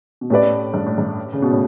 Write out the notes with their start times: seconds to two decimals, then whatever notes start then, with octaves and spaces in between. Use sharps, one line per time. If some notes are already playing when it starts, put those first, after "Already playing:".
0.21 B2
0.30 A2 A3 C#4 G4 B4 D5
0.74 G2
0.86 A2
0.98 G2
1.33 C#3
1.42 B2
1.51 A2